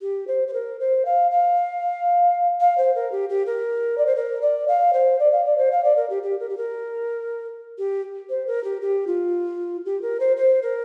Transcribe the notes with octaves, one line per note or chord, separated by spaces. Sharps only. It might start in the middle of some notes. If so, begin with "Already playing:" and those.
G4
C5
C5
A#4
C5
F5
F5
F5
C5
A#4
G4
G4
A#4
D5
C5
A#4
D5
F5
C5
D5
F5
D5
C5
F5
D5
A#4
G4
G4
A#4
G4
A#4
G4
C5
A#4
G4
G4
F4
G4
A#4
C5
C5
A#4